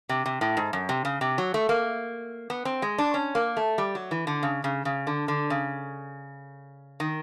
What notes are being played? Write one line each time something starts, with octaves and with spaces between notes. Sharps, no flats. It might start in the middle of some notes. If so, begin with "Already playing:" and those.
C3
C3
A2
G#2
F#2
C3
C#3
C3
F#3
A3
A#3
B3
C4
G#3
D4
C#4
A#3
A3
G3
F#3
E3
D3
C#3
C#3
C#3
D3
D3
C#3
D#3